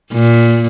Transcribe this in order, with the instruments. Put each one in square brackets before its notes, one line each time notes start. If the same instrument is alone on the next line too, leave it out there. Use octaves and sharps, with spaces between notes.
[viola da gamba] A#2